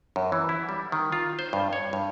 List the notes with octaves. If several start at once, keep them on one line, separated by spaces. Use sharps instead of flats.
F#2
E3
E4
G3
D#3
F4
C5
G2
C#5
G2